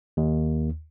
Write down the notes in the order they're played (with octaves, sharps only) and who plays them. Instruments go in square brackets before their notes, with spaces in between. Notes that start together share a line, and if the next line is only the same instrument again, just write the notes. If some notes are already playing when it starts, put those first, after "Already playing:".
[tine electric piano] D#2